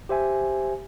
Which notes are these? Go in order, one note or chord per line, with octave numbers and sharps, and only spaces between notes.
G4 C5 E5 G#5